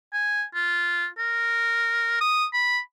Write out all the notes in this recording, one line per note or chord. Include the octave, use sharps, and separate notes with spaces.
G#5
F4
A#4
D#6
B5